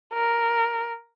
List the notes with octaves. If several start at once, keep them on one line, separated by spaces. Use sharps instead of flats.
A#4